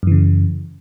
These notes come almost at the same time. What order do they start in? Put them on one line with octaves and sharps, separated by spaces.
F#2 E3 C#3